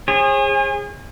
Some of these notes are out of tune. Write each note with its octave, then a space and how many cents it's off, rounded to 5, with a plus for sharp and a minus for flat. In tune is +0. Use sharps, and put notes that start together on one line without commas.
G#4 -25 C#5 -45